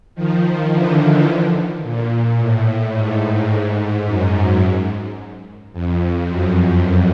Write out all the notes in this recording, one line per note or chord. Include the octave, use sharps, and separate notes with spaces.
D#3 F3
D3 E3
A#2
A2
G#2
G#2
F#2
F2
F#2